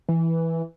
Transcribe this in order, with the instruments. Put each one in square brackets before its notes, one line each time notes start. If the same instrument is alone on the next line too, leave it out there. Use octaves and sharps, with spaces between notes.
[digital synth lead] E3